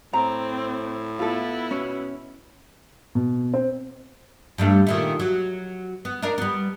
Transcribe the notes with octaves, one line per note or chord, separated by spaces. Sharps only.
A2 C4 A#5
B3 E4 F4 A4
B2 C#4
B2
C4
G2 G3 A3
A#2 D#3 A3
F#3
B3
D4 D#4 A#4
G3 B3